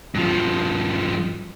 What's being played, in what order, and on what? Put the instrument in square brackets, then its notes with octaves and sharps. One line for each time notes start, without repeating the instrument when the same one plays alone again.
[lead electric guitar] G2 F3